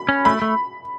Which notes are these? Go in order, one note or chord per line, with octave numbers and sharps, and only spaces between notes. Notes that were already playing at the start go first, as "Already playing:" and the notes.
Already playing: B5
C#4
A3 B5
A3